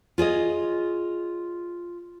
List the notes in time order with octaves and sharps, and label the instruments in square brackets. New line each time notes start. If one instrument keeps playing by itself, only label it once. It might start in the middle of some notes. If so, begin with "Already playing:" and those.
[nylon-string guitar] F4 G#4 C#5 D#5